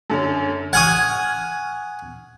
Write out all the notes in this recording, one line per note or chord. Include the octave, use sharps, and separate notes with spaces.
F#2 D3 C#4
F#5 G#5 C#6 D#6 F6 G#6